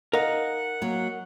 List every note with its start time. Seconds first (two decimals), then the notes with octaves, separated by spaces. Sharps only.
0.13 D#4 A#4 D#5 F5 F#5
0.82 F#3 A#3